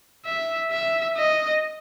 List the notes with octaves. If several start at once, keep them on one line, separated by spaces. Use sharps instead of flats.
E5
E5
D#5